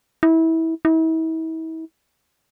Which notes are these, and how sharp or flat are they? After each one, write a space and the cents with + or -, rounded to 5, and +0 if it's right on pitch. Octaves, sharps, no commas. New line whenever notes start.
E4 -25
E4 -40